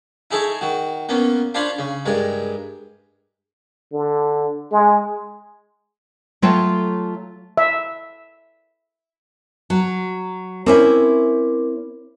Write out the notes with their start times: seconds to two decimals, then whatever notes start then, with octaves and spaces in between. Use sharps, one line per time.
0.31 D#4 E4 G#4 A4 C#5 E5
0.61 D#3 F#4
1.09 A#3 B3 C#4
1.54 D4 F4 C5 C#5 B5 C6
1.79 C#3
2.06 G2 G#3 A#4
3.93 D3
4.72 G#3
6.42 F#3 A3 F4 C#5 G5 A5
7.57 E5
9.70 F#3
10.66 C4 C#4 E4 A#4 D6